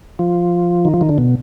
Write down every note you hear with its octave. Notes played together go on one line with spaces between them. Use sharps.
F3
D#3
F3
D#3
D3
B2